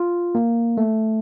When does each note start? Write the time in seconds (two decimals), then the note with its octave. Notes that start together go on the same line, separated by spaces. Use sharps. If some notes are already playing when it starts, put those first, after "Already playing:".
Already playing: F4
0.35 A#3
0.77 A3